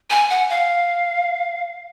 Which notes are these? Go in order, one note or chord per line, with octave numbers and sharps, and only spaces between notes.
G#5
F#5
F5